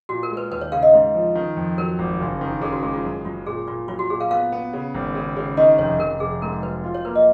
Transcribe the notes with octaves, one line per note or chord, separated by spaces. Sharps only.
A#2 F#4
A#4
G#3
B4
D#2 B4
C#5
C#3 F5
D#5
G#2
F3
D#3
F2
F#3 A#4
G#1
F#1
D#3
C#3 G#4
F#4
G#3 G#4
F4
F#2 F4
F#2 F4
A#2 G#4
A#2 F4
F#3 F4
F#4
A#2 G#4
F5
B3 F5
B3
C#3
G#1
C#3
C#3
D#3 D#5
F1 C#5
F1 A#4
F1 G#4
G#2 A#4
F#3 B4
F4
C#5
A#3 B4
D#5